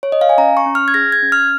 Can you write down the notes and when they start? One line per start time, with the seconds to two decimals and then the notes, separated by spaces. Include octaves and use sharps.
0.03 C#5
0.12 D#5
0.21 F5
0.29 G#5
0.38 C#4 A#5
0.57 C#6
0.66 C#4
0.75 F6
0.88 G#6
0.94 G#4 A#6
1.12 G#6
1.23 C#4
1.32 F6